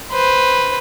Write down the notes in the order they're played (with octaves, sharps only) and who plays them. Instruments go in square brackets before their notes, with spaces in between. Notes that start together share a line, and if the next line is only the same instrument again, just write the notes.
[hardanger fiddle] B4 C5